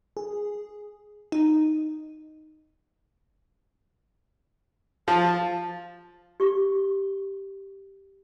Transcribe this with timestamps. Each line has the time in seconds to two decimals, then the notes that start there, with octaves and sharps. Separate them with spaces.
0.17 G#4
1.32 D#4
5.08 F3 A5
6.40 G4 C#6